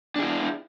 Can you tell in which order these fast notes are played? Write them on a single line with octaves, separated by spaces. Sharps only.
D4 G#4 E4